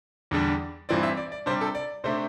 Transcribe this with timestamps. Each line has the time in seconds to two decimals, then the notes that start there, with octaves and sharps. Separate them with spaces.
0.31 E2 D3 G3 D4
0.89 G2 E3 C4 D5
1.03 E5
1.17 D5
1.32 D5
1.46 C3 G3 D4 C5
1.61 A4
1.75 D5
2.04 C3 A3 D4 C5